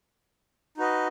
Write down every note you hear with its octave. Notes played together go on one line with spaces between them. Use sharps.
D#4 F#4 B4 D#5